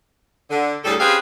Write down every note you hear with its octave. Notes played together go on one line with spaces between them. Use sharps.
D3
D2 A2 G3 G#4 A4
C4 C#4 G4 G#4 B4 F5